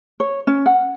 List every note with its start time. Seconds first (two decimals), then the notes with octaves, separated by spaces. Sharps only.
0.20 C#5
0.47 C#4
0.66 F#5